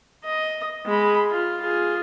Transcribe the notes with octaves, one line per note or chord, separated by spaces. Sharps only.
D#5
G#3 B5
F4
F4 G#4